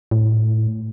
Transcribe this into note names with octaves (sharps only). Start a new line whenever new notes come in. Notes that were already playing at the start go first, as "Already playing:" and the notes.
A2